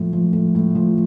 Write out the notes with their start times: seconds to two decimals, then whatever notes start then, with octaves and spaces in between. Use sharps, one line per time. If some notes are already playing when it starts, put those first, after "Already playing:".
Already playing: A2 F3
0.13 F3
0.33 A2
0.55 A2
0.75 F3